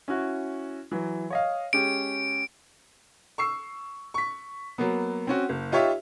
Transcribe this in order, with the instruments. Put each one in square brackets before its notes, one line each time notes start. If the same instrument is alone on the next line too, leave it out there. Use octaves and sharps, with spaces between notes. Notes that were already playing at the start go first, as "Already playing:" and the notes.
[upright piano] C#4 E4 F#4
E3 F#3
C#5 D#5 F5
[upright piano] G#3 C#4 G4 [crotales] D7
[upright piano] C#6 E6 C7
C#6 B6
F#3 A#3 B3
C4 C#4 F#4
F#1
D#4 F4 G4 C#5 E5